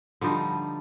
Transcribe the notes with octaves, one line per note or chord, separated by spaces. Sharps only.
D3 F3 G3 D#4